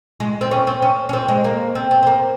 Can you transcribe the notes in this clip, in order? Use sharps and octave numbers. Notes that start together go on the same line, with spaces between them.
G#3
C4
C#4
C4
C#4
C#4
C4
G#3
A#3
C4
C4
C4
A#3